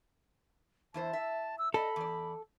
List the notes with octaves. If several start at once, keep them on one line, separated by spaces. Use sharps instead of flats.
E2 E4 C5 A5
E5
E6
A4 D5 D#5 B5
E2 D5